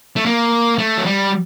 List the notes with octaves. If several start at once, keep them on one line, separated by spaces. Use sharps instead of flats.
A3
A#3
A3
F#3
G3